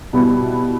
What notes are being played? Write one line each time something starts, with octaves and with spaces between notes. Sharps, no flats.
B2 G3 B3 E4